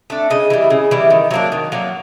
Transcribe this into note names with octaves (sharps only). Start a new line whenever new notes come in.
A3 D4
C#3 D#5
E3 G3
C#3
E3 G3
D#3
F#3 A#3 D4
D#3
F#3 A#3 D4